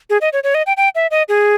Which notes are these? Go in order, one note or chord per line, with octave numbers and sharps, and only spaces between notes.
G#4
D#5
C#5
C#5
D#5
G5
G5
E5
D#5
G#4